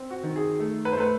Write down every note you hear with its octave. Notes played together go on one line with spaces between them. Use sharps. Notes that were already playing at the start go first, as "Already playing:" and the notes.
Already playing: C4
F#4
D#3
G#4
A3
B4
C5
A3 B4